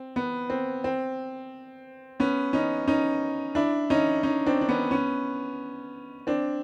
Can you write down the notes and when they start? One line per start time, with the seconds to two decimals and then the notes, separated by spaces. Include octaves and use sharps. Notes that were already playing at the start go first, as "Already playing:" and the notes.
Already playing: C4
0.16 B3
0.50 C4
0.84 C4
2.20 B3 C#4
2.53 C#4 D#4
2.87 C#4 D#4
3.55 D4 E4
3.90 C#4 D#4
4.23 C#4 D#4
4.46 C4 D4
4.61 D4
4.69 B3 C#4
4.91 B3 C#4
6.27 C4 D4